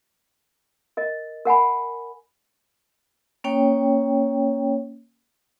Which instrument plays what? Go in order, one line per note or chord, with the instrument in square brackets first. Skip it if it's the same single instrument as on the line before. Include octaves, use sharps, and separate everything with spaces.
[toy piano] A#4 D#5
A#4 F#5 G#5 B5
[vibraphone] A#3 C#4 C#5 G5